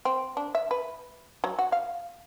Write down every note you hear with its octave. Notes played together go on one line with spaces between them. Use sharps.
C4
D4
E5
B4
F#3
F#4
F5